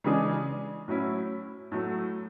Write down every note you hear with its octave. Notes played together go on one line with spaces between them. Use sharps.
C#3 E3 G#3 D4 G#4
A2 F#3 C#4 E4
A2 F#3 A3